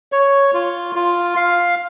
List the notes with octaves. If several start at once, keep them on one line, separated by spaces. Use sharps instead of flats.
C#5
F4
F4
F5